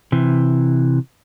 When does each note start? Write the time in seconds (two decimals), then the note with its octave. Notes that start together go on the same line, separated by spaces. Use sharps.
0.12 C3 E3